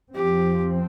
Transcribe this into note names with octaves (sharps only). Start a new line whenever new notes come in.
F2 F3 C4 G4